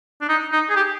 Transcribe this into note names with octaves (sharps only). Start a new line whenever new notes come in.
D4
D#4
D#4
G#4
G4